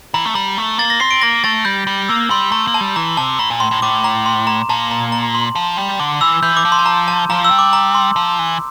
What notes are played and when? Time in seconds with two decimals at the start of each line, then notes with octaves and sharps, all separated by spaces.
0.14 E3 A#5
0.25 A3
0.35 G3 A#5
0.58 A3
0.78 A#3 A6
0.90 A#6
1.00 C4 C7
1.11 D7
1.21 A#3 A#6
1.44 A3 A6
1.65 G3 G6
1.87 G3
2.09 A#3 E6
2.30 G3 C6
2.52 A3 A#5
2.67 A#3
2.74 A5
2.81 G3
2.96 E3 A#5
3.17 C3 A5
3.39 A2 A#5
3.50 A#2
3.60 A2 C6
3.71 A2
3.82 A2 D6
4.04 A#5
4.26 C6
4.47 A#5
4.69 A#2 A5
4.91 A#5
5.12 A#5
5.35 C6
5.55 F3
5.77 G3
6.00 D3 D6
6.21 E3 E6
6.42 E3 G6
6.57 D6
6.65 F3
6.72 C6
6.79 A5
6.86 A#5
7.08 A5
7.30 F3 A#5
7.44 E6
7.51 G3
7.59 D6
7.73 A#5
7.95 C6
8.16 F3
8.39 E3